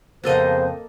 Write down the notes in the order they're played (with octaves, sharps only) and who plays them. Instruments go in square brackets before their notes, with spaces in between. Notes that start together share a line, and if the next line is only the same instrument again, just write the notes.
[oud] F2 B3 [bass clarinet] C#3 [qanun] A#3 A4 D#5 [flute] C5